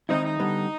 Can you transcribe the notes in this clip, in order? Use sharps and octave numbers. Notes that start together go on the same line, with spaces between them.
D#3 G#3 C4 D#4 E4
D#4
D3 G3 B3